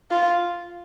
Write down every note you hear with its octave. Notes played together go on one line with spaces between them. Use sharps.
F4